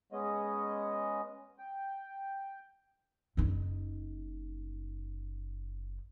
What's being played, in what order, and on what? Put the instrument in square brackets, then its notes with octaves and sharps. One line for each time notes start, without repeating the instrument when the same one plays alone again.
[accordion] G#3 B3 C#4 D#5
G5
[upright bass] F#1 D#4